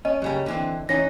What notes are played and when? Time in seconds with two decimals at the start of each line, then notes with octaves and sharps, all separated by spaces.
0.05 C#4 D#5
0.22 F#2 C#3 G3
0.46 D3 E3 C4
0.89 E3 C#4 D#4 C#5 A#6